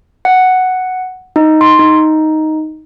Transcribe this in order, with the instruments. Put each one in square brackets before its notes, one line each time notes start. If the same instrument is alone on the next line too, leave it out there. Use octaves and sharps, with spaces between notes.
[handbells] F#5
D#4
C6
D#4